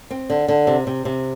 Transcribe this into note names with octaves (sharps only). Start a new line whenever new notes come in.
C4
D3
D3
C3
C3
C3